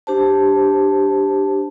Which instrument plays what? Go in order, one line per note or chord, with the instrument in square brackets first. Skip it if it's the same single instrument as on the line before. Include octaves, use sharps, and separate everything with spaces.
[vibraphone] D4 G4 C5 A5